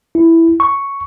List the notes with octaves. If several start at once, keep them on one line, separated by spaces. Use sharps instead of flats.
E4
C#6